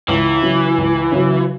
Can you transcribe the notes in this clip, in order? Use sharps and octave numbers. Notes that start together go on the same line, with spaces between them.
C#2 E3
C#3 F#3
C#2
C#3 F#3